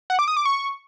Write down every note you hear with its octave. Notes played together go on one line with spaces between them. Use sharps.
F#5
D6
D#6
D6
C#6